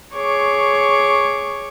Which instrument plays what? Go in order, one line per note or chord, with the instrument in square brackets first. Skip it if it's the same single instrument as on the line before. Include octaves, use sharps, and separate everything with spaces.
[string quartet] G#4 C#5 C#6 D6